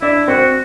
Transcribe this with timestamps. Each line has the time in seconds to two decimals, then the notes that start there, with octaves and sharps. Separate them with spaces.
0.02 D4 E4 D5
0.28 C4 F#4 C5